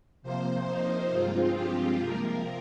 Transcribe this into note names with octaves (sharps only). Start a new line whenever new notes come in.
C3 F3 A#3 C5
D#4
G2 F3 G#3 C4 F4
G4
C3 F3 A#3 A#4